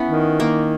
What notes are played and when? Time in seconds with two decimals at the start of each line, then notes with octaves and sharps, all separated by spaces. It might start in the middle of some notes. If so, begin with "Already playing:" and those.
Already playing: B3 C#4 E4
0.08 D#3
0.40 A#3